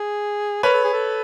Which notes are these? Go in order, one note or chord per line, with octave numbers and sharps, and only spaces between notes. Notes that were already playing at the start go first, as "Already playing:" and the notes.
Already playing: G#4
A#4 B4 C#5
A4
G#4
A4